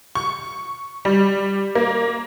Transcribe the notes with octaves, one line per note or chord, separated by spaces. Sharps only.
C#6
G3
A#3